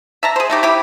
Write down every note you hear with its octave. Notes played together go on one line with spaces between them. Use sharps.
E5 A5 A#5
G#4 C5
A3 D#4 G4
E4 G4 B5